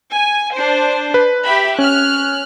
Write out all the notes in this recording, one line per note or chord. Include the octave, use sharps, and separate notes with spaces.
G#5
D4 C5
B4
G4 E5 B5
C#4 F6 F#6